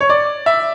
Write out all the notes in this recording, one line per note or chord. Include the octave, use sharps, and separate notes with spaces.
C#5
D5
E5